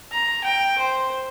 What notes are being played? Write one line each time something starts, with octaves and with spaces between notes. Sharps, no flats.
A#5
G5
C5